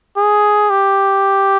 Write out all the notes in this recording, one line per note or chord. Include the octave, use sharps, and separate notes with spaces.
G#4
G4